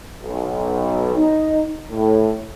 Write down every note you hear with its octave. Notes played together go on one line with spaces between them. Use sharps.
B1
D#4
A2